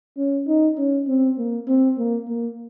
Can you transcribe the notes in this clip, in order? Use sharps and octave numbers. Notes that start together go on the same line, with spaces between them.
C#4
D#4
C#4
C4
A#3
C4
A#3
A#3